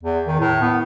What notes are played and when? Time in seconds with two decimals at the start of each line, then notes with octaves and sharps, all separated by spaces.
0.03 E2
0.27 D#3
0.39 A2
0.62 B3